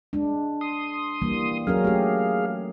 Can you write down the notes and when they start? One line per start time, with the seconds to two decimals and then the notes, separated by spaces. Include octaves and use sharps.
0.13 G#3 D4
0.61 C6 D#6
1.22 E3 G3 A#3
1.67 F#3 C#4 G#4 A#4 F5
1.84 A3 G4